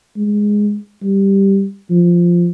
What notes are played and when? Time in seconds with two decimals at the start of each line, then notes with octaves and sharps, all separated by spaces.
0.17 G#3
1.03 G3
1.90 F3